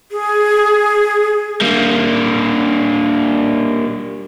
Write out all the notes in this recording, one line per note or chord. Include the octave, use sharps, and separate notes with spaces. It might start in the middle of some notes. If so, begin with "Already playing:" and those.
G#4
G3 A#3 D4